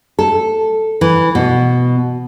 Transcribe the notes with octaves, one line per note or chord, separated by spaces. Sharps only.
A4
E3
B2